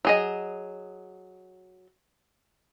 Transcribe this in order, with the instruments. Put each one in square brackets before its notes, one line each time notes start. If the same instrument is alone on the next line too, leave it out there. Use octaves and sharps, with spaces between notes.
[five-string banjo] F#3 G#4 D#5